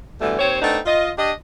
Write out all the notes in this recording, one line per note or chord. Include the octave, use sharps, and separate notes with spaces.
B2 D3 E3 G3 A3
D#2 C4 C5 C#5
A3 B3 C4 D4 D#4
F4 D#5
D4 G4 D#5